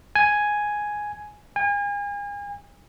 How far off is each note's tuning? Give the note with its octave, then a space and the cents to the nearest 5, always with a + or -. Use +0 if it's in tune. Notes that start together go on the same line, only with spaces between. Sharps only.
G#5 +5
G#5 -35